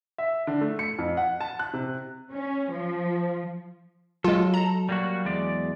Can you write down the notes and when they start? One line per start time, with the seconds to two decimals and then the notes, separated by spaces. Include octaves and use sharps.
0.18 E5
0.47 D3
0.61 A3
0.79 C#7
0.99 F2
1.17 F#5
1.41 A5
1.59 F#6
1.73 C3
2.31 C#4
2.71 F3
4.24 F#3 G#3 F4 A4
4.54 A#5
4.89 G3 A#3 F#4
5.25 E2 G#3 D5